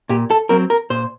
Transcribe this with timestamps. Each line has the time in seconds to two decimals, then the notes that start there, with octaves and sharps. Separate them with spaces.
0.09 A#2 G4
0.30 A4
0.49 F#3 C4 A#4
0.70 A#4
0.90 A#2 C5